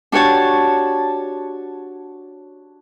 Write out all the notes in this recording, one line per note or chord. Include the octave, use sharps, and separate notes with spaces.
D4 F#4 G4 C#5 A5